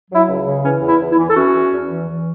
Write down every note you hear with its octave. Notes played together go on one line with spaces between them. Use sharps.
F#3
E4
C#2
C#3
E3 C#4
E2
E4
E2
E4
E3
A4
E3 C#4 F#4
E2
E2
E3
E3